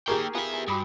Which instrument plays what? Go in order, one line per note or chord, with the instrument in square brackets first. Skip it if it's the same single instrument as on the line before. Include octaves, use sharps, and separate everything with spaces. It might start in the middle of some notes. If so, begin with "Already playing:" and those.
[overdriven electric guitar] A#3 G5 [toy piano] D#4 A#5 C#6 [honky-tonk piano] G4 G#4 A#4
[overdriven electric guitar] B3 E5 [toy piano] F4 F5 G#5
[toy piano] G#5
[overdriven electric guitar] G2 [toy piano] F#4 B5 D#6